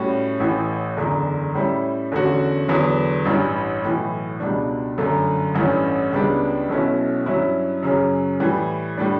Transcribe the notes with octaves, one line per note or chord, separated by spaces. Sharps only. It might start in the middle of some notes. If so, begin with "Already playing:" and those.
Already playing: A2 G3 C#4 F#4
A1 A2 E3
F#1 E2 D3
A2 G3 C#4 E4
E2 D3 A3 C#4 F#4
E2 D3 F#3 B3
A1 G2 E3 G3
B1 A2 E3
C#2 B2 G3 D4
G1 F#2 D3 A3
A1 G2 E3 A3 C#4
C#2 C#3 G3 B3 D4
B1 B2 A3 C#4 E4
G2 F#3 C#4 E4
F#2 C#3 F#3 C#4
A2 E3 G3
A2 G3 D4